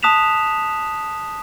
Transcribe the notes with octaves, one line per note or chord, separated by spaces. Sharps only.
A5 D#6 F#6 B6 E7 F7